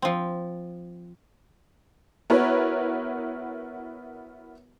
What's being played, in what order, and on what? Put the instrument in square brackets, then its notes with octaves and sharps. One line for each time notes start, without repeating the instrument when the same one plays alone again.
[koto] F3 C4
[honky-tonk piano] B3 E4 F#4 A#4 B4 C#5